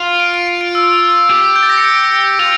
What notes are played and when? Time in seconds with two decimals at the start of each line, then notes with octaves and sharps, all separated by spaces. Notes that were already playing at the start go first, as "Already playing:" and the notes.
Already playing: F4
0.20 D7
0.34 D7
0.47 D7
0.61 D7
0.75 E6
1.29 G4
1.56 G6
1.63 A6
1.70 A#6
1.78 C#7
1.85 D7
2.39 F4